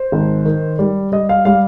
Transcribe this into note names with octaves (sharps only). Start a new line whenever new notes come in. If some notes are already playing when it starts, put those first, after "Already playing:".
Already playing: C5
G#1
D#3
G3
G3 D#5
F5
G3 F5